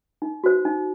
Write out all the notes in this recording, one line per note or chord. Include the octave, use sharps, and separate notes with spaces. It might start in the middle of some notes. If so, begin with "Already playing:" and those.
D#4
F#4 C5
D#4